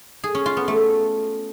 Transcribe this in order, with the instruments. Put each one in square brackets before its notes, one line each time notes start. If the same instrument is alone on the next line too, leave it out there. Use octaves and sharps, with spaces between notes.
[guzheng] G#4
C#4
F4
B3
A3